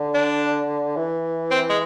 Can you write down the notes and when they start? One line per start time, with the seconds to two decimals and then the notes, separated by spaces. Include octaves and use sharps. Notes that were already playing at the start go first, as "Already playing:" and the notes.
Already playing: D3
0.14 D4
0.97 E3
1.51 C4
1.69 G#3